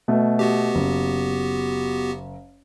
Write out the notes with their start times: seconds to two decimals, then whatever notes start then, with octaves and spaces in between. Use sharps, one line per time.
0.08 B2 A3
0.39 B3 F#4 G4
0.75 F#1